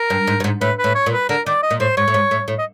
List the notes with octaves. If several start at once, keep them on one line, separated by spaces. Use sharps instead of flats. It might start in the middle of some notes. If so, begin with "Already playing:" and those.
Already playing: A#4
G2
G#2
G2
G#2
A2 B4
B4
A2
C#5
A#2
B4
D3 A#4
D#3 D5
D#5
A#2
A2 C5
G#2 C#5
A2
G#2
A2
A2
D#5